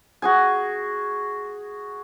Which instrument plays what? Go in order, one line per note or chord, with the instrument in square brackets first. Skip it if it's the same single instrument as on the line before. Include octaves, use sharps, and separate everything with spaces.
[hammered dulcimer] F#4 G#4 G#5